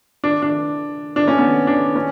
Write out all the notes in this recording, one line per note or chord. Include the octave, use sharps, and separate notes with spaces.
D4
D4
D4
C#4
B3
D4
C#4